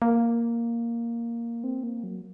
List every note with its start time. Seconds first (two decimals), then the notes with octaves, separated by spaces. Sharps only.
0.02 A#3
1.64 C4
1.83 A#3
2.04 F#3